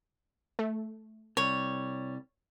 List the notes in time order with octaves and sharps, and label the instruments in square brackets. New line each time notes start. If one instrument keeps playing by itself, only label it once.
[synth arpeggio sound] A3
[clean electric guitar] C2 G3 [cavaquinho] C#5